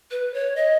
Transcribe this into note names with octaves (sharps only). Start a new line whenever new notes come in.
B4
C#5
D#5